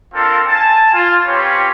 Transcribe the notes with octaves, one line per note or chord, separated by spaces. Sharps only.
C4 D4 F4 A4 A#4
G#5 A5
F4
C4 C#4 F4 G4 B4 C#5